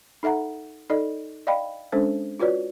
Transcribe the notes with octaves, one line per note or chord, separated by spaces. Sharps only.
D#4 A4 E5 F#5 A#5
D#4 A4 D5 D#5
D5 D#5 F5 G5 B5
G#3 C#4 D4 A4 C5
F4 F#4 B4 C#5 D5